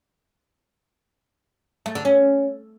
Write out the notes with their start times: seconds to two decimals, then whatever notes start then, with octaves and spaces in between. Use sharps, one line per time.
1.86 A3
1.95 D3
2.05 C#4